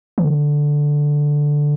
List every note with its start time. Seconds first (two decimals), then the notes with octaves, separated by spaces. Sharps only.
0.18 E3
0.24 D3